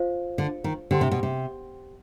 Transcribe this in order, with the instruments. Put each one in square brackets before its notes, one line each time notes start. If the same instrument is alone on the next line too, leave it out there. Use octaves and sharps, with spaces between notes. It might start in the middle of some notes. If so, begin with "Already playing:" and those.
Already playing: [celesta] F4 C5 F5
[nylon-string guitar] D3
D#3
[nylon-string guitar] D3 [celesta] G4 C5 G5 C6
[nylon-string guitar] C3
B2
C3